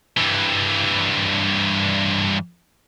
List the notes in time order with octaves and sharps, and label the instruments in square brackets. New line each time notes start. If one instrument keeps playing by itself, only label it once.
[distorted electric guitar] G2 E3